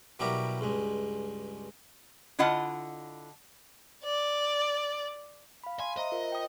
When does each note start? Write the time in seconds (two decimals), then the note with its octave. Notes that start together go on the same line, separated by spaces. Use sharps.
0.19 B2 F#3 G3 E4 G4 A#4
0.61 C#2 G2 G#3
2.39 D3 E4 F4 D#5 F#5 A5
4.04 D5
5.64 F5 B5
5.80 F5 G#5 C6
5.97 C5 D#5 E5 A#5
6.12 F4 A#4 C5
6.32 G5 D#6